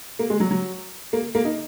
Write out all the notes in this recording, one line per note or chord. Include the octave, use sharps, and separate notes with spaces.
A#3
G#3
F#3
F#3
A#3
A#3
D#4